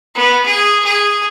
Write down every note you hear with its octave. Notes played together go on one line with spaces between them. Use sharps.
B3
G#4
G#4